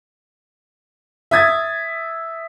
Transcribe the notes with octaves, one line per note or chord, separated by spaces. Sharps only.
E5 D#6 G#6 A6